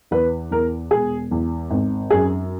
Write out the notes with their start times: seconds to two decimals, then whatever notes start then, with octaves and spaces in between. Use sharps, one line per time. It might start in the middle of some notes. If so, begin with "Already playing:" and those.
0.11 E2 B4
0.51 E2 A#4
0.91 E1 G#4
1.31 E2
1.70 G#1
2.10 F#2 G#4